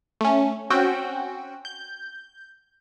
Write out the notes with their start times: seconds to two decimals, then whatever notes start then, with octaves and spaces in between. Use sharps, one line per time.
0.21 A3 C#4
0.70 C4 C#4 F#4 G5
1.65 G6